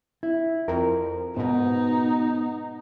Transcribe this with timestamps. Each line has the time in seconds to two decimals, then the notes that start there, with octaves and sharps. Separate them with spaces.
0.23 E4
0.68 F2 A#4
1.37 G#2 B2 B3 D#4